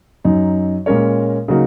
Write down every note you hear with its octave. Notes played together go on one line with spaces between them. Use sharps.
F#2 F#3 D#4
A#2 G#3 C#4 A#4 C#5
C#3 F#3 A#3 D#4 F#4